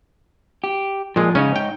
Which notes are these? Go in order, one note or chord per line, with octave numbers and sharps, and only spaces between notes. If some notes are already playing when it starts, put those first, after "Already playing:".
G4
A#2 F3 G#3
G#2 C#3 C#4 D#4 C#5
G5